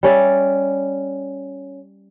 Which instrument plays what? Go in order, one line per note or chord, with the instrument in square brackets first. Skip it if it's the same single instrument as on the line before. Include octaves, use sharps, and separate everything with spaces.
[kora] G3 C#4 D5 E5